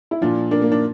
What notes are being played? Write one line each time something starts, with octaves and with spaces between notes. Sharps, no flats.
E4
A#2 F3 D4 F4
A#3 D4
A#3
D4